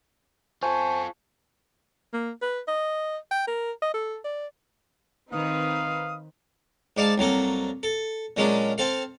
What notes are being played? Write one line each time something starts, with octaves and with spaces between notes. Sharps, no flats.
F4 A4 C5 G#5 C#6
A#3
B4
D#5
G5
A#4
D#5
A4
D5
D#3 C4 D#4 B4 F5 D#6
G#2 D5 F5 A5
C2 F#3 A#3 A4
A4
A#2 F#3 G#3 C#4 D4
C4 A4 F5